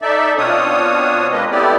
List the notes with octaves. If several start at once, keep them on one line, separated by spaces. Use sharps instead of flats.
D#4 A4 D5 E5
B2 C4 D4 F4 C#5 D#6
G#3 A#3 B4 D#5
A3 B3 C4 E4 G4 D5